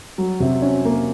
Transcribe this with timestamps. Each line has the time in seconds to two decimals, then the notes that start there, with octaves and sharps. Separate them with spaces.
0.18 F#3
0.40 C3
0.62 C#4
0.85 A#3